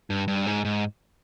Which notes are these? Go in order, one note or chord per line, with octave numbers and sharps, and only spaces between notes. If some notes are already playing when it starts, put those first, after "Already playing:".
G2
G2
G#2
G#2